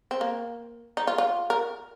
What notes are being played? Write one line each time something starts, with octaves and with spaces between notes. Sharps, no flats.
C4
A#3
D#4
F4
F4
A#4